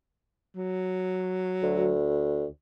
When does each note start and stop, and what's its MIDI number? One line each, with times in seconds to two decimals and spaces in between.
0.56 1.96 54
1.63 2.46 38